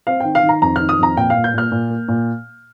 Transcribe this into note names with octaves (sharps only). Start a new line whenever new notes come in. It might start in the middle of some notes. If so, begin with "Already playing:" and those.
C4 F5
D#3 G5
F5
D#3
A#5
F2 A#5
D#3 F6
D#6
F2 A#5
A#2 G5
A#2 F5
G6
A#2 F6
A#2
A#3
A#2